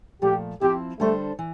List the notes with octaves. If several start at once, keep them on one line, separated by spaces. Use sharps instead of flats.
A#2 F3 A3 G4
F3 C4 E4 G4
D3 G3 A3 D4 A4 C5
E3